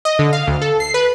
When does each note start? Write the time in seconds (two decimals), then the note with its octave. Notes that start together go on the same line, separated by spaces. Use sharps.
0.05 D#5
0.19 D3
0.33 F5
0.47 D2
0.62 A4
0.80 C7
0.94 B4